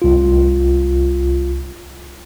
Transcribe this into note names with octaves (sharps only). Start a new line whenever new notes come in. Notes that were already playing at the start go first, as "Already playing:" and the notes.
C2 F4